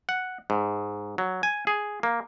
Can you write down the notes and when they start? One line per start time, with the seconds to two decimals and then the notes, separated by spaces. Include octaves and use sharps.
0.09 F#5
0.50 G#2
1.18 F#3
1.43 G#5
1.67 G#4
2.03 A#3